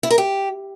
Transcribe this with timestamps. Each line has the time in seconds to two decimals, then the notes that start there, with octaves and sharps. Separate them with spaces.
0.03 E4
0.11 A#4
0.18 G4